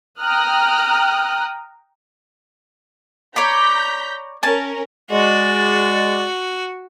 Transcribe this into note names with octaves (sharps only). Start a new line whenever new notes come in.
G5 A#5 D#6 F6 F#6
C#5 D5 A#5 B5 G6 B6
C#4 A#4 G#5 A5
G#3 F#4 D5